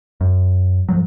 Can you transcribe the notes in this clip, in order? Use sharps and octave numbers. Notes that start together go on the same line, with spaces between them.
F#2
G#2 F3 F#3